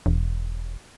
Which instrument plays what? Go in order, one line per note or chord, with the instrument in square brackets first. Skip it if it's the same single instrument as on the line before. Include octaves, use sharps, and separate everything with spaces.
[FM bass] E1